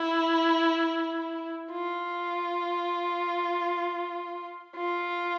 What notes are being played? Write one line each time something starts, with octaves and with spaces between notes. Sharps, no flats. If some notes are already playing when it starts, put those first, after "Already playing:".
Already playing: E4
F4
F4